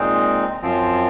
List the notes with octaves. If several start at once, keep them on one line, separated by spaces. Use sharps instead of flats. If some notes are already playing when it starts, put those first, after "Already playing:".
Already playing: A#2 G#3 C4 D#4
F#2 F3 C4